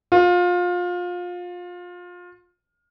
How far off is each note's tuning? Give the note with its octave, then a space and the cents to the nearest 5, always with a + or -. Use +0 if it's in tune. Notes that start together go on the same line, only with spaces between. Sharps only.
F4 +25